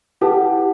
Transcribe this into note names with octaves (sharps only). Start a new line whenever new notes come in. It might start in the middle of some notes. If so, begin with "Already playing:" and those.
E4 G4 B4 F#5 A5